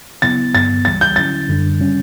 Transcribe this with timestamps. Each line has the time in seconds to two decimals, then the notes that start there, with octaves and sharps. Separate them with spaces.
0.22 C#3 F#3 B3 E4 A6
0.54 G2 D3 F#3 B3 A6
0.85 C#2 C#3 E3 G3 A6
1.01 G6
1.16 D3 F#3 C#4 E4 A6
1.48 F#2 D3 G3 D4
1.80 C#3 G3 C#4